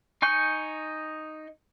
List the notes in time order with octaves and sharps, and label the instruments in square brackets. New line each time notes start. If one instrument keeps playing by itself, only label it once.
[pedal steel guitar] D#4 G#5 C#6 G6